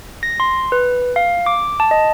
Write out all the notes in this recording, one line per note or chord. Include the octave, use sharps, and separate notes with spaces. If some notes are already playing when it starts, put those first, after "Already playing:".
A#6
C6
B4
F5
D6
A5
D#5